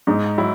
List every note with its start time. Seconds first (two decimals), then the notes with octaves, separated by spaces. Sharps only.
0.07 G#2 D#4
0.38 F#3 E4